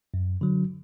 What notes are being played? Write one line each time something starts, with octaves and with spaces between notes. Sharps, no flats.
F#2
D3 F#3